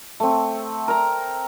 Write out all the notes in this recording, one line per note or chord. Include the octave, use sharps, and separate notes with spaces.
A3 C4
A#4 A#5